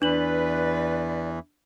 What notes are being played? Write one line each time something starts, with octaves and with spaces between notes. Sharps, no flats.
E2 E3 D4 B4 D5 F#7